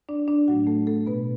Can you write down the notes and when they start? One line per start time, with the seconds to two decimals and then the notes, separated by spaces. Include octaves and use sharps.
0.09 D4 D5
0.28 D4 D5
0.48 A2 F#3 A3 F#4 F#5
0.67 A3 A4
0.87 A3 A4
1.06 B2 A3 B3 B4